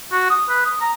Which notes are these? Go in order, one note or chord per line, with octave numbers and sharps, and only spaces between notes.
F#4
D#6
B4
D#6
A#5